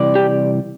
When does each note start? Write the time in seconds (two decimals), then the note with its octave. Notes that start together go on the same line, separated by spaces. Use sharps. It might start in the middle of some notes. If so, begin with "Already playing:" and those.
Already playing: C3 E3 G3 D5
0.15 G4